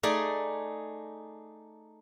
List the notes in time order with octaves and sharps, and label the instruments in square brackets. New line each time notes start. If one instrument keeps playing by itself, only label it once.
[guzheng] A3 D#4 G#4 D5